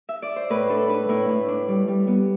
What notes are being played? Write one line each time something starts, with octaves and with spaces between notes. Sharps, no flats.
E5
D5
C5
A2 B4
D4 A4
D4 B4
A2 E4
A2
D4
G3
G3
B3